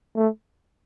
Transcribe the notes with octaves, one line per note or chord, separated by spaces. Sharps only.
A3